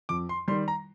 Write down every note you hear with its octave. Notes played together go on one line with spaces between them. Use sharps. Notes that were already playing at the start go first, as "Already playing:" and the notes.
F2 D6
C6
D#3 G3 C6
A#5